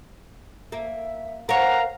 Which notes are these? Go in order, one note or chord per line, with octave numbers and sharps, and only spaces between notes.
A#3 E5
A#4 C#5 F5 F#5 A#5